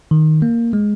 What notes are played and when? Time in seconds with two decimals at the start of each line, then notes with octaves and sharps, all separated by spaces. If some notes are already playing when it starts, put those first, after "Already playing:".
0.11 D#3
0.42 A#3
0.73 G#3